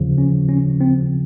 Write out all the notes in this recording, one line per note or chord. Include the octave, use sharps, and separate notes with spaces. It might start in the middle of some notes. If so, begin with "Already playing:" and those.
Already playing: D#2 C#3 F3
C#4
C#4
C4